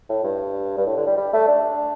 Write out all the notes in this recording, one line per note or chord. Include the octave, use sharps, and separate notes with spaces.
A2
G2
G2
A2
D3
G3
G3
A3
D4